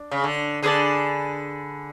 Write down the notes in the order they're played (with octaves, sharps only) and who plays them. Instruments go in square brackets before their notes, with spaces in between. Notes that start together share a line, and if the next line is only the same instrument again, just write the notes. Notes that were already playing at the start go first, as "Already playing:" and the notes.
Already playing: [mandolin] D4
[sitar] C#3
D3
[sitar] D3 [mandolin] G#4 B4 D5 A5